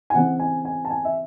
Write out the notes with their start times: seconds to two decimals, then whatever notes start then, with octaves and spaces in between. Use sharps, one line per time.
0.10 G#5
0.14 C#3 E3 C4 F#5
0.39 G#5
0.65 G#5
0.85 A5
0.90 G#5
1.05 E5